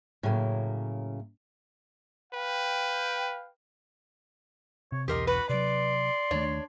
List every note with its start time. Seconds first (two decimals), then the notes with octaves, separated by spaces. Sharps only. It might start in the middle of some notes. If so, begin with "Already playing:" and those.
0.23 A2 C#3 F#3 A#3
2.33 B4 F5 G5
4.92 C3 C#5
5.08 B1 E2 G4 A#4 D#5 C6
5.27 F#4 B4 B5
5.49 C3 F#3 D5 C6
6.31 D#2 D#3 A3 D4 C#5